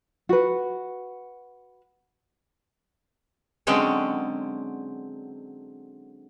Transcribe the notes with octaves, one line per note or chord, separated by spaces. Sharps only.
F#4 B4
D3 F#3 G#3 C4 C#4